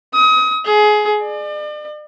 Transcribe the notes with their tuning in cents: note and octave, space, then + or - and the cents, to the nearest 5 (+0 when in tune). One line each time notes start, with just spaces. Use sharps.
D#6 +30
G#4 +20
D5 +40